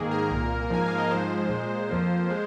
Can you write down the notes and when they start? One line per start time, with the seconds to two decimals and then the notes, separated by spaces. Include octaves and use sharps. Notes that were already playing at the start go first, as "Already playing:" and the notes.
Already playing: G#2 D#3 A#3 G#4
0.11 A#4
0.31 C2 A#2 A#3
0.70 G#2 F3 A#3 G#5
0.86 F5
0.98 D#5
1.11 G#2 F3 G#3 C5
1.50 A#2 G#3
1.90 F2 F3 A#3
2.30 G#3